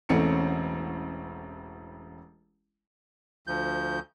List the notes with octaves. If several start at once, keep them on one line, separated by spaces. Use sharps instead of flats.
E1 A1 A3 C4 C#4 C#7
D2 F3 G6